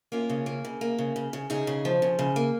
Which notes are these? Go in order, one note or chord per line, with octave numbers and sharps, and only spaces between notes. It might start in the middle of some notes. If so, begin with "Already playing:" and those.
A#3 C#4 F4
C#3
A#3
C#3
A#3
C#3
C#3
C#3
C#3 D#4 G#4
C#3
F3
C#3
C#3
A#3